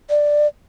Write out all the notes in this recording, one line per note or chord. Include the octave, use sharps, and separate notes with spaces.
D5